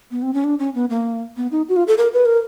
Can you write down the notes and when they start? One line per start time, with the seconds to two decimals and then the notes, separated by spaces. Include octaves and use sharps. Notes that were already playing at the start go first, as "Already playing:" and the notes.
0.11 B3
0.22 C4
0.34 C#4
0.44 D4
0.59 C#4
0.75 B3
0.90 A#3
1.37 B3
1.51 D#4
1.69 F#4
1.76 F4
1.88 A4
1.98 A#4
2.13 B4
2.25 A#4